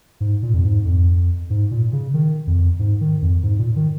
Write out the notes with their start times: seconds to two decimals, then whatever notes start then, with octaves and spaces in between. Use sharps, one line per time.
0.20 G#2
0.43 A#2
0.54 F2
0.65 G#2
0.85 F2
1.50 G#2
1.71 A#2
1.93 C#3
2.14 D#3
2.47 F2
2.79 G#2
3.01 D#3
3.22 F2
3.43 G#2
3.59 A#2
3.76 D#3